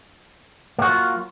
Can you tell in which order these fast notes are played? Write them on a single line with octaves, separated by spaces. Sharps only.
A#3 F#4 F#3 F4